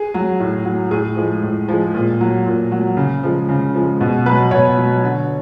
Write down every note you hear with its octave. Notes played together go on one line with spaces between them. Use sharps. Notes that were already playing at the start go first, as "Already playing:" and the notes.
Already playing: G#4
F#3
A2
F#3
A2 G#4
F3 G#3
A2
F3 G#3
A#2
F#3
A#2
F#3
C#3
F3 G#3
C#3
F3 G#3
B2
F#3 B4
B2 C#5
F#3
D3